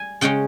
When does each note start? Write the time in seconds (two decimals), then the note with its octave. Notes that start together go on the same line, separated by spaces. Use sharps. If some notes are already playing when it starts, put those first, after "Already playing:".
Already playing: G3 G#5
0.21 C#3 G#3 C#4 G5